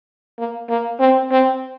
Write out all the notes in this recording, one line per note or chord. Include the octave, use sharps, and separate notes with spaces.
A#3
A#3
C4
C4